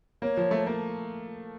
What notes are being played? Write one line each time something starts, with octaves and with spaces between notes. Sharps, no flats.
A#3 C#5
F3
A3
A#3